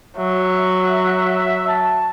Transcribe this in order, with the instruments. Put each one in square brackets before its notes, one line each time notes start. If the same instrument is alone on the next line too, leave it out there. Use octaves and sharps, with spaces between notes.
[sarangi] F#3 [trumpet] E5
[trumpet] A5